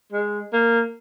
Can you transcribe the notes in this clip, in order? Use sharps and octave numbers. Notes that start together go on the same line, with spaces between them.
G#3
A#3